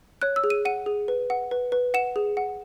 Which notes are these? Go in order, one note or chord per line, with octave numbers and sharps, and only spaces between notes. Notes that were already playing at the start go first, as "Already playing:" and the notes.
C#5 F#6
E6
G#4
D#7
F#5 D#7
G#4
B4
F#5
B4
B4
F#5 E7
G#4
F#5